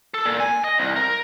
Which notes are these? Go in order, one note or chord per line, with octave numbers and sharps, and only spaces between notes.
A4
A#2
G#5
D#5
C2
A#4